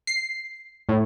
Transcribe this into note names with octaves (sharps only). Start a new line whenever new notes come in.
C7
A2